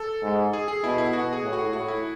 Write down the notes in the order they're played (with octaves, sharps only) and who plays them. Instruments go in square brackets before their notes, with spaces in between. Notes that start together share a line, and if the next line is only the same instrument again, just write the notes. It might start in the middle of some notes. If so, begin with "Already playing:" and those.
Already playing: [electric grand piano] A4
[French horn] G#2
[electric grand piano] G#4
G#4
[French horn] B2 [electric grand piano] E4
[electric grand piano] E4
[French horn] B2 [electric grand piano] F#4
[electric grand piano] G#4
[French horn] A2
[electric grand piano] F#4
[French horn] A2 [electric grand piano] F#4
[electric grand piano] E4